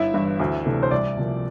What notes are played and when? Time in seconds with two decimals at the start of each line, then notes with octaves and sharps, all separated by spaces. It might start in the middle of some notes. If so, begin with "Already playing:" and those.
Already playing: G1 E4 E5
0.14 G2 E3
0.40 D2
0.65 C3 E3 A3 D4
0.83 C5
0.91 C2 D5
1.17 C3 F3 A#3